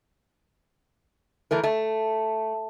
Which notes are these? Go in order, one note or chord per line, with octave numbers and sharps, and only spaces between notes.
E3 A3 A#4
A3